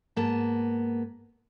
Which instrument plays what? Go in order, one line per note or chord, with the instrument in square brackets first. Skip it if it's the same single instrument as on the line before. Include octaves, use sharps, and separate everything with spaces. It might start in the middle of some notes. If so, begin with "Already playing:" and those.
[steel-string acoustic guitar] G#2 A#3 B3 A5